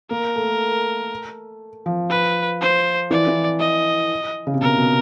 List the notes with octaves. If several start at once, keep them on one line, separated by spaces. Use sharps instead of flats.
A#3 A#4
A3
F3
B4
C5
E3 D5
E3
D#5
C#3
C3
B2 A#4
B2